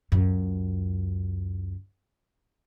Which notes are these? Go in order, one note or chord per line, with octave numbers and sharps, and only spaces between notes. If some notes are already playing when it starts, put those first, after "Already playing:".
C#2 F#2